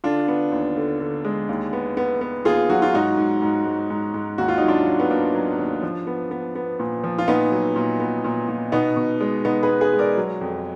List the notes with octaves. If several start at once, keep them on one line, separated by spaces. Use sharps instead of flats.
D3 D4 F4
B3
D#2
D3
D3
G#3
D#2
B3
B3
B3
D#2 F4 G#4
F#3 F#4
F4
G#2 D#4 F#4
G#2
G#2
G#2
G#2
G#2
D#2 F#4
F4
F#3 D#4
D4 F4
F#3
B3
A#3 D4
F#3
D#2
F3
B3
B3
B3
A#2
F3
F4
A#2 B3 D#4
F#3
A#2
B3
A#2
A#2
B2 B3 D#4
B2
G#3
B2 B3 D#4
G#4 B4
B3
G#4 B4
G#3
A#4 D5
F#3
F2